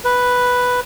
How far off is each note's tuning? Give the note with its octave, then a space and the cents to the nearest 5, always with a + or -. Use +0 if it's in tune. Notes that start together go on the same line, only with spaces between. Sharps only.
B4 +0